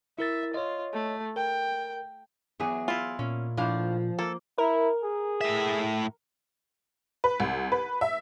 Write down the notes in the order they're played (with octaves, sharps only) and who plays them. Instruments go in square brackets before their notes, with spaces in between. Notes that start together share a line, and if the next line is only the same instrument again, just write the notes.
[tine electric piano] E4 A#4 A6 [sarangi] E5
[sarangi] F4 [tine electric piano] C#5 D#5
[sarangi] A3
[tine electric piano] A#4 [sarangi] G5
[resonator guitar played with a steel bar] E2 F#3 G#4 [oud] B3
[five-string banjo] E4 F4
[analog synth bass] A#2 [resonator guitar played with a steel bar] C#4
[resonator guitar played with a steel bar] A2 D4 F5 [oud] F3
[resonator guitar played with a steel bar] A#3 [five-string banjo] A4
[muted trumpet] E4 [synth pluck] A#4
[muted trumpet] G#4
[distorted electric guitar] A2 E5
[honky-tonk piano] B4
C2
B4
E5